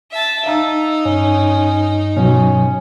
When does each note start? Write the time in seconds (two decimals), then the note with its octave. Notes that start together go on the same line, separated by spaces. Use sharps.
0.11 E5 A5
0.46 D#4 F5 A#5 E6
1.05 G2 C#4
2.17 B2 F#3 C#4